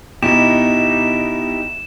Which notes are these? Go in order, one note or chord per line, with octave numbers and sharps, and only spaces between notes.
B2 D#4 E4 G4 E7